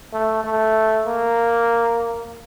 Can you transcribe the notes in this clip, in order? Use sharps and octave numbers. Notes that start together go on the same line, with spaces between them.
A3
A3
A#3